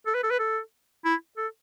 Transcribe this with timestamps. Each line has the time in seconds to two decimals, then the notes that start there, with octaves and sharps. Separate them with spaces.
0.06 A4
0.14 B4
0.23 A4
0.31 B4
0.39 A4
1.05 E4
1.37 A4